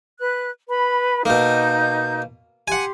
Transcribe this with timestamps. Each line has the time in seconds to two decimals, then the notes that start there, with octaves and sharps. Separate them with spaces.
0.19 B4 F#6
0.69 B4 B5
1.25 B2 A#3 D#4 G6
2.68 G4 F#5 G#5 C6